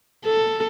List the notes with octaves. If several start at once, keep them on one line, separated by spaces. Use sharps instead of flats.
A4